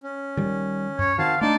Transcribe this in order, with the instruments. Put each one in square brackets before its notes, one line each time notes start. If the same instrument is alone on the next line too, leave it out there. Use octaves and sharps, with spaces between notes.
[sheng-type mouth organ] C#4
[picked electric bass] D#3 G3
[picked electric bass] F#2 [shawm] C#5
[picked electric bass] D#3 [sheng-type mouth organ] C4 F#4 A5 [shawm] F5
[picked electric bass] A3 D4 [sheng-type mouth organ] D#4 A5 C6 [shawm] D5